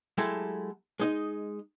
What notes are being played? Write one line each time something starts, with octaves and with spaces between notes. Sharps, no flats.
F#3 G#3 A3 E4 G4 A4
G#3 D#4 D#5